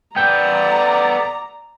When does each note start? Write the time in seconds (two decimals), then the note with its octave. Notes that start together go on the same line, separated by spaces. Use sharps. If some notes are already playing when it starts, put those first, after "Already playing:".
0.16 B3 A4 D5 G5 A#5 G6